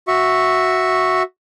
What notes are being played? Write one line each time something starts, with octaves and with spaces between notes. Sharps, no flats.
F#4 E5 C#6